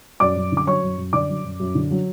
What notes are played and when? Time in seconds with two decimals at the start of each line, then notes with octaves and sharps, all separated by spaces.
0.20 F#2 D5 D6
0.36 F#2
0.52 D3
0.57 D6
0.67 F#3 C#5 C#6
0.83 F#2
0.98 F#2
1.13 D3 D5 D6
1.29 F#3
1.45 F#2
1.60 F#2
1.75 D3
1.91 F#3